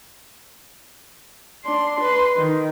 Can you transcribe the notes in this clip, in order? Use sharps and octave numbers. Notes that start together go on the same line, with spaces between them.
D4 C6
B4 C6
D#3